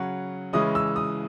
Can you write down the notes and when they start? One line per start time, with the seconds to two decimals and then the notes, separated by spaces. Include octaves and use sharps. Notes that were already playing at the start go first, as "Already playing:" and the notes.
Already playing: C#3 F#3 C#4 F#5
0.53 C#3 E3 G#3 C#4 E4 D#6
0.75 E6
0.96 D#6